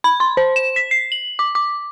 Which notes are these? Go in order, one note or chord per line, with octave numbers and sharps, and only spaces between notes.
B5
C6
C5
E7
B6
C7
F#7
D6
D6